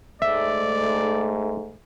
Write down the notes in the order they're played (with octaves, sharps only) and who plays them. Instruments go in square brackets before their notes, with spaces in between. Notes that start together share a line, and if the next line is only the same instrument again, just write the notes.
[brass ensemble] G#2 A3 [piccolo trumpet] D5 [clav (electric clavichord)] E5